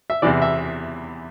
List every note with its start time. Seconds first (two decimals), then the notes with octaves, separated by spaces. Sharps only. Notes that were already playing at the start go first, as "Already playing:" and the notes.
0.10 E5
0.22 E2 C3 E3 D5
0.42 E5